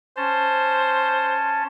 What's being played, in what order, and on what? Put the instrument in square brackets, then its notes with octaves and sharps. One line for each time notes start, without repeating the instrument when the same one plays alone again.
[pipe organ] C#4 A5 [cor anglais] C5